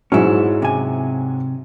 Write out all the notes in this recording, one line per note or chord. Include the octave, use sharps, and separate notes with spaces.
G#2 F#3 C#4 E4
C3 G#5